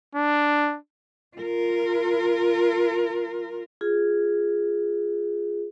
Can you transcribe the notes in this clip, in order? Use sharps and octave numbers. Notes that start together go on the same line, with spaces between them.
D4
F4 A#4
F4 G#4